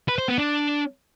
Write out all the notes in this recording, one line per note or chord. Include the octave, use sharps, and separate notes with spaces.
B4
C5
B3
D4